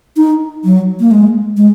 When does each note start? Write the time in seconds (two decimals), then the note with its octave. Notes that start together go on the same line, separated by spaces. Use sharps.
0.17 D#4
0.65 F#3
1.00 A#3
1.11 G#3
1.57 G#3